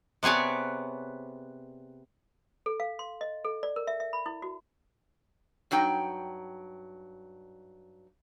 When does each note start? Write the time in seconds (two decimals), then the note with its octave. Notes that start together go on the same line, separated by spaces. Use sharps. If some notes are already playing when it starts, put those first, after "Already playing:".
0.23 C3 B3 G#4 C#5 D5
2.66 A4
2.80 F5
2.99 C6
3.21 D#5
3.45 A4
3.63 D5
3.76 A#4
3.87 E5
4.00 E5
4.13 B5
4.26 E4
4.42 F#4
5.71 G2 F#3 D#4 G5